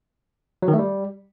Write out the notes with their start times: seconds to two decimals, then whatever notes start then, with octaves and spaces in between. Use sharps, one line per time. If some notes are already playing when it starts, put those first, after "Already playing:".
0.62 F#3
0.68 D#3
0.73 A3
0.79 G3